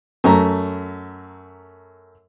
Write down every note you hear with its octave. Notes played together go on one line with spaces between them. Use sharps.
F#2 A3 A#5